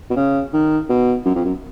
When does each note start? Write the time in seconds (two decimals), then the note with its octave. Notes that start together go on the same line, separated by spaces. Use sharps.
0.10 B2
0.16 C#3
0.53 D#3
0.89 B2
1.25 F#2
1.35 F2
1.45 F#2